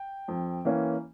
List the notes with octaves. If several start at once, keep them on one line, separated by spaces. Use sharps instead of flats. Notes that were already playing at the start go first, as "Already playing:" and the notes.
Already playing: G5
F2
E3 A#3 C#4